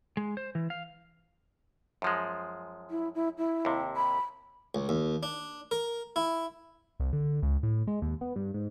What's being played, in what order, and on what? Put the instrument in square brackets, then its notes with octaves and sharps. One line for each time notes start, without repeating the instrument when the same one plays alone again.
[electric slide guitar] G#3
C5
E3
F5
[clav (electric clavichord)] F#2 F3 G#3
[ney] E4
E4
E4
[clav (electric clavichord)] D#2 C3
[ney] B5
[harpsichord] C#2
D#2
D4
A#4
E4
[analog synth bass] C2
D3
C#2
A2
G#3
D#2
B3
G2
G#2